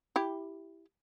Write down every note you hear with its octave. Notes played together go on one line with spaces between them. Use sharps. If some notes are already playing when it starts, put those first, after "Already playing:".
E4 G4